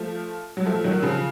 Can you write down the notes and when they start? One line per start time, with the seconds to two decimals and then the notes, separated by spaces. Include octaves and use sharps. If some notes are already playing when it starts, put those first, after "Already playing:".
Already playing: F3 A3
0.57 F#3
0.66 F3 A3
0.84 D#3 F#3
1.03 C#3 F3